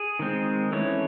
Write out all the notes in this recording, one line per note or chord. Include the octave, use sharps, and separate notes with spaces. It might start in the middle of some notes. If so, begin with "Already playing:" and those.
Already playing: G#4
D#3 G#3 C4
E3 A3 C#4 C#5